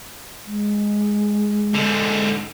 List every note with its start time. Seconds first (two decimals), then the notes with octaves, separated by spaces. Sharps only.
0.46 G#3
1.74 G#2 D3